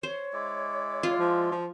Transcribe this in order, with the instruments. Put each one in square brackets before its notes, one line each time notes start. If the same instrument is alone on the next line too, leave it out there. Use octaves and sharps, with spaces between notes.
[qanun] C5 [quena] C#5
[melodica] G#3 E4 D5
[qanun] F4
[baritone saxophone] F3 [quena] C6
[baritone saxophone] F3